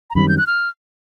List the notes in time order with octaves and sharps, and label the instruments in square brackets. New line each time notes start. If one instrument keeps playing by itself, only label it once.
[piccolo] A#5
[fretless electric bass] F#2 D#3 G3 C4 [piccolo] B5
[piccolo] G6
F#6
F6